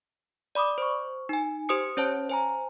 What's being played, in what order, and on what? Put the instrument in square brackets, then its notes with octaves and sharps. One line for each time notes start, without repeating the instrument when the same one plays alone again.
[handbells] D5 B5 D6 D#6
C5 C#6
D#4 G#5
G4 C5 D#6 C#7
C#4 C5 C#5 A5
C5 G#5 A#5